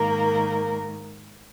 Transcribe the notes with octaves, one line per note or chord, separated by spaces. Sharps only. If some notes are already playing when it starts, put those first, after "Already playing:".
Already playing: G#2 D#3 A#3 A#4